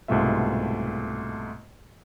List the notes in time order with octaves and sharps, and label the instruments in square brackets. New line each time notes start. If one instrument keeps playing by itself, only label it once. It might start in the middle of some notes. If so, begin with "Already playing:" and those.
[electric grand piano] C2 G#2 B2 A3 F4 E5